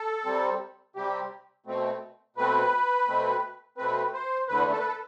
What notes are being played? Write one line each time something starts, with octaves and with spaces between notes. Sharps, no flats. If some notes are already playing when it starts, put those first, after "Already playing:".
Already playing: A4
C3 G3 C4
C3 G3 C4 G4
B2 A3 C4
B2 A3 C4 B4
B2 A3 C4
B2 A3 C4 B4
C5
E2 D3 A3 B4
A4
B4
A4